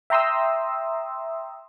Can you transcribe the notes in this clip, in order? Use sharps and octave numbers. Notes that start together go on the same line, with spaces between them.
E5 G5 A#5 C6 D#6 E6